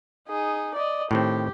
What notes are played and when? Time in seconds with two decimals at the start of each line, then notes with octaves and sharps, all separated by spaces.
0.29 D#4 G#4
0.75 D5 D#5
1.11 A2 D#3 C4 G4